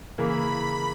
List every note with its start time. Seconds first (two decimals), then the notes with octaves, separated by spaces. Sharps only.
0.18 C#3 E3 A#3 E4 B5